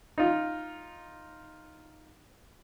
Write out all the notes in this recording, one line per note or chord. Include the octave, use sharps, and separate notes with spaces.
D#4 F4